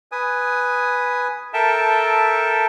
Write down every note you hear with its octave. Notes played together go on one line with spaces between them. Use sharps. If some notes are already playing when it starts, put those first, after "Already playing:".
B4 G#5 D#6
A4 A#4 E5 G5 A5